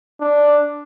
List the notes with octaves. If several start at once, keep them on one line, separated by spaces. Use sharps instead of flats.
D4